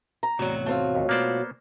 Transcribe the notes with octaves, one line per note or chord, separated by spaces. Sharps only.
A#5
E2 A2 C3 F#3 F#4
A3 C4 F4
D#2
B2 A#3 B3 C5 D5